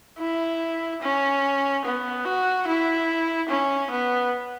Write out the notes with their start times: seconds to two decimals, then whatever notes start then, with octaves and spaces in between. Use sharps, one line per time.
0.19 E4
1.02 C#4
1.85 B3
2.25 F#4
2.67 E4
3.49 C#4
3.91 B3